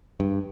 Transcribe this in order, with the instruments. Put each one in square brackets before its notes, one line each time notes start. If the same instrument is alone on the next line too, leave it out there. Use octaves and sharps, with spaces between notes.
[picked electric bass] G2